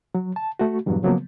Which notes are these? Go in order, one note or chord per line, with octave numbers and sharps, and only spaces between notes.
F#3
A5
A3 F#4
E2 G2 A#2 F#3
C#3 F3 F#3 A#3 B3